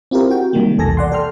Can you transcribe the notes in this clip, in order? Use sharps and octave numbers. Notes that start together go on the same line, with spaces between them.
C4 E4 F4 G4 A#4
F#4 G5
C3 D#3 G3 G#3 A#3
B1 E2 A4 G#5 A5 A#6
D5 F#5 C6
A4 G5 C6 F6